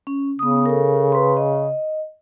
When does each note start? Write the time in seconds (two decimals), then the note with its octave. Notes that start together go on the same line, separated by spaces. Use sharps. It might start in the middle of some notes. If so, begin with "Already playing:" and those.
0.07 C#4
0.39 C#3 B3 D#6
0.66 A4 A#4
1.12 B4 C6
1.37 D#5